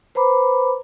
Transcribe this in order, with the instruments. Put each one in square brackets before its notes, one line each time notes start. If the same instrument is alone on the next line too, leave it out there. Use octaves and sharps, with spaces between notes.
[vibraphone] B4 C5 A#5 B5 D6